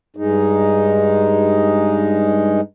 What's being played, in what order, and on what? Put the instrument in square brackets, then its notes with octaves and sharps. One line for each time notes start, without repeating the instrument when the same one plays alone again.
[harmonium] G2 G#3 D#4